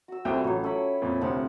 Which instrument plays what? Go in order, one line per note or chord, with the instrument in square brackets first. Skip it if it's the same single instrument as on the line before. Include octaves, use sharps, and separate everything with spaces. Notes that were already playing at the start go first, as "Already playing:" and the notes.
[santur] F#4 E6
[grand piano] C2 C4 G5 [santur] E4 F4 A4
[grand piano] A1 [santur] F#3 C#5
[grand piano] C#4 [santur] A4 G5 B5
[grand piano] F2 A#2
[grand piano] D2 C3 [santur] F3 C4 F#5